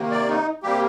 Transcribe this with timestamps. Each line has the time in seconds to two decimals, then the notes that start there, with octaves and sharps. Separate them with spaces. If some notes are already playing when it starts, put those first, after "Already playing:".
Already playing: C3 D#3 A#3
0.11 D5
0.29 D#4
0.63 C3 G3 A#3 G4